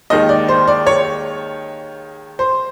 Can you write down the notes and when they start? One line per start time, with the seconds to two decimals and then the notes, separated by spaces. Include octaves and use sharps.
0.10 D#2 D#3 G#3 D#5
0.29 D5
0.49 C5
0.68 D5
0.87 C#5
2.39 C5